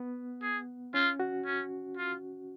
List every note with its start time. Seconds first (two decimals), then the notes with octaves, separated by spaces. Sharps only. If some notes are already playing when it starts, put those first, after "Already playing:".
Already playing: B3
0.42 G#4
0.94 C#4 F4
1.20 F#4
1.45 C#4
1.97 F4